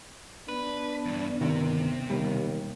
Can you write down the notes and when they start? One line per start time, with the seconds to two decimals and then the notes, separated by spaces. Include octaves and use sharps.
0.48 B3 D4 B4
1.05 E2 G2
1.41 G1 D#2 C3 D#3
2.09 E1 D#2 G3